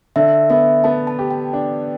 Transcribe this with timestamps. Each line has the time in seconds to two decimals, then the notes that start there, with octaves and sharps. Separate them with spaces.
0.16 D3 E5
0.50 B3 E5
0.84 B3 A5
1.07 A5
1.19 G4
1.31 G5
1.53 D4